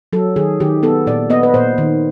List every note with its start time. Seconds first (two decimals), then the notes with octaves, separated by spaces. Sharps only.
0.13 F#3 A4
0.36 D#3 G#4
0.60 D#3 G4
0.83 B3 A4
1.07 A#2 D5
1.30 B3 D#5
1.43 B4
1.54 A#2 C5
1.78 D#3